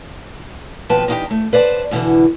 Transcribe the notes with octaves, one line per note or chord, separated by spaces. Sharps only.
D#2 B2 F3 B4 G5 A5
E2 D4 D#4 F#4 G4 G5
A3
B4 C5 D5 D#5 A5
E2 B2 D3 E3